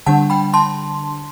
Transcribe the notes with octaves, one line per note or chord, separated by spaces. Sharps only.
D3 G3 D4 F#5 A5
G5 B5
A5 C6